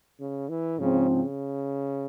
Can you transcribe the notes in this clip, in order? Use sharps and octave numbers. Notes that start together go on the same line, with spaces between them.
C#3
E3
G#2 C#3 F3 C4
C#3